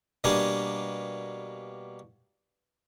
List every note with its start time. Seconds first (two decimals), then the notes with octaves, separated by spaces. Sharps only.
0.24 B2 G3 A#3 D4 G#5